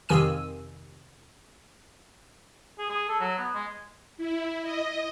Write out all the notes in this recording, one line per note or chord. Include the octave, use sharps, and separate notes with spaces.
F2 C3 D#3 G#5 E6 D#7
G#4
G#4
A4
F#3
B3
G#3
E4
D#5